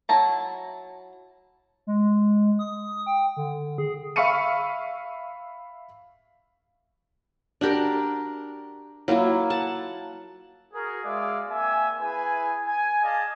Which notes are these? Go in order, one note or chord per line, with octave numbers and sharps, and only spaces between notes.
F#3 E4 A5 A#5
G#3
D#6
G5
D3
G#4
E5 F5 B5 C#6 C#7 D#7
D4 F#4 G4 A#4
F#3 A#3 E4 F4
F#5 A5
F#4 G#4 A#4
G#3 G#4 D5 E5 F5
A#3 C4 E5 G#5
E4 G#4 B4 G#5
G#5
G#4 D5 D#5 F5 G#5 A5